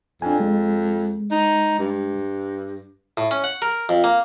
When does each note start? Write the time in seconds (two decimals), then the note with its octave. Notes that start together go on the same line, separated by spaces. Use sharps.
0.22 F2 D4 G#5
0.40 G#3
1.32 D#4
1.79 G2
3.17 A2
3.31 C#4
3.44 F#5
3.62 A#4
3.89 F2
4.04 A#3